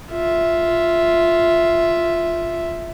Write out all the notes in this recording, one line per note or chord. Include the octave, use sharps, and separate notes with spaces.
F4 E5